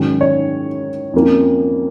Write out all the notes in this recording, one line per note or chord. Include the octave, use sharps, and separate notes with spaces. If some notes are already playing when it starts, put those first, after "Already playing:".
Already playing: G#2 D#3 F#3 C#4
C#5
F2 F3 A#3 C#4